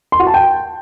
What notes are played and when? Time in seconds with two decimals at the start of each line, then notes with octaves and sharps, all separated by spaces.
0.12 C6
0.20 F#4
0.27 A5
0.34 G5